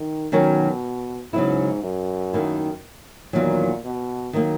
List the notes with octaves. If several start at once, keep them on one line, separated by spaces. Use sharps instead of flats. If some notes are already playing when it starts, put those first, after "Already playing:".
Already playing: D#3
B2 D#3 F#3 C#4 F#4 A#4
G#2 C#3 F#3 B3 E4
F#2
D#2 D#3 A#3 E4
E2 A#2 D#3 F#3
B2
D#3 F#3 A#3